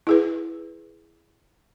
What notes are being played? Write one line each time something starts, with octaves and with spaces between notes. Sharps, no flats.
E4 G#4 B4